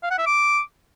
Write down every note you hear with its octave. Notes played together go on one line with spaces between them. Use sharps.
F5
F#5
E5
D6